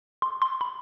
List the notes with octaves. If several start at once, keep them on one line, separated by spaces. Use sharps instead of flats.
C6
C6
B5